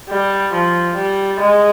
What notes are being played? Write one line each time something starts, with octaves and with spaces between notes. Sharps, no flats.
G3
F3
G3
G#3